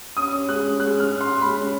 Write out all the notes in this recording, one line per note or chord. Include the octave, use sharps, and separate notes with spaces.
C#4 D#6
C#4
G#3 F#6
C#4
G#3 F#6
C#4 F6
C#4
C#4 C6
G#3 B5
C#4